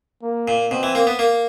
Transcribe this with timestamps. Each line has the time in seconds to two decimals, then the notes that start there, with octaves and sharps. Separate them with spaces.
0.23 A#3
0.48 A#2
0.71 B2 C4
0.83 E3
0.95 A#3
1.07 B3
1.19 A#3